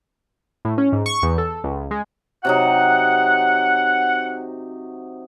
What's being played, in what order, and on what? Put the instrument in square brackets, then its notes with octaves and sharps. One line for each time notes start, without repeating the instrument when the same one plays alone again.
[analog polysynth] A2
C#4
G#2
C#6
E2
A4
C#2
G#3
[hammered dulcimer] C3 F#3 D#4 [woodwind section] F#5